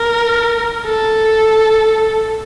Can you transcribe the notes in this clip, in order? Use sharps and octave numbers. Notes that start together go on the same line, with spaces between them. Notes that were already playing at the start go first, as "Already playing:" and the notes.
Already playing: A#4
A4